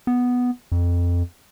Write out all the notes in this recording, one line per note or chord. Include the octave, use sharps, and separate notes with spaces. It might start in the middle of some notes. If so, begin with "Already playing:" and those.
B3
F2